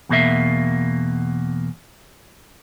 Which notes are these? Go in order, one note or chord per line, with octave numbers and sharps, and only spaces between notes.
E2 B2 A#3 E5